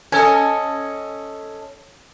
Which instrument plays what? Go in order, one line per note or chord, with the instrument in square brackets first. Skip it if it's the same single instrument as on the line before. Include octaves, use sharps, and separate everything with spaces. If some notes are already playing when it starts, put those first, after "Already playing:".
[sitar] C#4 A4 D#5 [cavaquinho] G#5